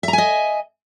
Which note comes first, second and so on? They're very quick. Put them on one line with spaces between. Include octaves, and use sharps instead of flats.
E5 A#5 G#5 D#5